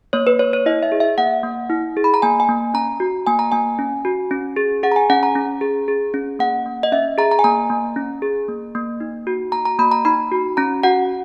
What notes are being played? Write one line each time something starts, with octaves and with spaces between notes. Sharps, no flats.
A#3 C#5
B4
A#3 C#5
C#5
E4 D#5
E5
G#4
E5
A#3 F#5
A#3
E4
G#4
B5
A#5
A#3 G#5
G#5
A#3
C#4 A#5
F#4
A#3 G#5
A#5
A#3 G#5
C#4
F#4
C#4
G#4
G#4 F#5
A#5
G#5
C#4 F#5
A#5
C#4
G#4
G#4
C#4
A#3 F#5
A#3
D#5
C#4 E5
G#4 A#5
A#5
G#5
A#3 A#5
A#3
C#4
G#4
A#3
A#3
D#4
F#4
A#3 A#5
A#5
A#3 B5
A#5
D#4 B5
F#4
C#4 A#5
F#4 F#5